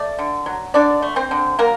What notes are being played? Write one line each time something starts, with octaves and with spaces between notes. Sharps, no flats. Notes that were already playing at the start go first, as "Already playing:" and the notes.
Already playing: A3 D5
D3
F#3
D3 D4 D5
A3
C4 C5
D3
F#3 A#3 A#4